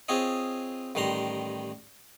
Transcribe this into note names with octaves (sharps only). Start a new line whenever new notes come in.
C4 F4 G#4 C#5 D#5
A1 D#3 G3 A#5 C6